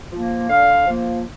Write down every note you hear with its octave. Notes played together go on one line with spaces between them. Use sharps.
F3 A#3
D3 F5
F3 A#3